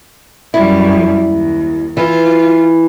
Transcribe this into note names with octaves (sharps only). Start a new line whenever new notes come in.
F#2 G3 E4
D#2
E3 F4